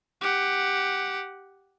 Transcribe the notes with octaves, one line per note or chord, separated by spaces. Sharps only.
G4 F#5